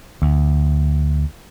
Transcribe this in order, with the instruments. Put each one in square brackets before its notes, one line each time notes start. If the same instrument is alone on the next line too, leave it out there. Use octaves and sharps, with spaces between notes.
[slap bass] D2